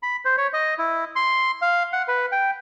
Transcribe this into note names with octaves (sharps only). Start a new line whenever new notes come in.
B5
C5
C#5
D#5
E4
C6
F5
F#5
B4
G5